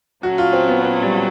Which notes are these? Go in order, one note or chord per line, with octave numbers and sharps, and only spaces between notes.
A#2 F#3 A3 C#4 F#4
F4
C4
B3
C4
G3